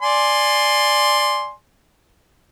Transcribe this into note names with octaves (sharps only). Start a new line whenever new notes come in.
D5 G#5 C6